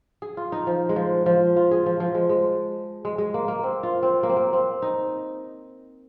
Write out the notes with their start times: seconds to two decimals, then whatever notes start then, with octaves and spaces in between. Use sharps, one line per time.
0.22 G#4
0.37 F4
0.52 D#4
0.67 F3
0.89 G#3
0.96 F3
1.26 F3
1.56 F4
1.71 G#4
1.86 F3
2.00 F3
2.15 G#3
2.29 G#3
3.05 G#3
3.18 G#3
3.34 A#3
3.48 A#3
3.63 C4
3.83 F4
4.03 C4
4.23 A#3
4.29 C4
4.37 A#3
4.53 C4
4.82 D#4